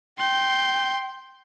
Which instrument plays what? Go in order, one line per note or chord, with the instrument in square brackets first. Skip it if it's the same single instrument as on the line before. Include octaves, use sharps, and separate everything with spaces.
[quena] G5 [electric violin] C6 G6